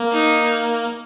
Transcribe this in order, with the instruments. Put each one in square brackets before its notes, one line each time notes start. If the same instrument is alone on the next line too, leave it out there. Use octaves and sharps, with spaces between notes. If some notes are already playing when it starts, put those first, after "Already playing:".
Already playing: [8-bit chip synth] A#3
[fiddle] D#4